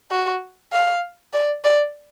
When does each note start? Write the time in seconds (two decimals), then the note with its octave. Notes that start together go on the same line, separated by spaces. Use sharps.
0.11 F#4
0.73 F5
1.33 D5
1.64 D5